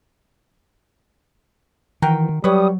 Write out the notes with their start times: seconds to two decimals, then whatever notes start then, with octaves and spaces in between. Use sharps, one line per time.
2.02 D#3 E3 F#4 A#4 G5
2.44 F#3 G3 B4 C#5 D#6